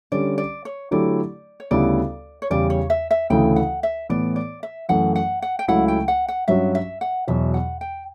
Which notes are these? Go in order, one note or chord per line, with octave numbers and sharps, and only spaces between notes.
D3 G3 C#4 D5
D5
C#5
D3 F#3 A3 E4 G4 D5
C#5
D2 C#3 G3 B3 E4 D5
C#5
E2 C#3 G3 C#4 G4 D5
C#5
E5
E5
D2 C#3 E3 A3 E4 G5
F#5
E5
A2 E3 B3 D5
D5
E5
F#2 E3 A3 F#5
F#5
F#5
G5
C#2 C#3 F#3 A3 E4 F#5
G5
F#5
F#5
G2 F#3 C#4 F#4 E5
E5
F#5
E2 B2 F#3 E5
F#5
G5